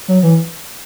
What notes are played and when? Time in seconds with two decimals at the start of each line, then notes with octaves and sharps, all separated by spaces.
0.08 F#3
0.23 E3